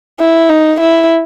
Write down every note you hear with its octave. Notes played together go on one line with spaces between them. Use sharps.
E4
D#4
E4